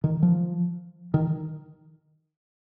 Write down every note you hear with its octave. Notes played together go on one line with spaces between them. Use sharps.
D#3
F3
D#3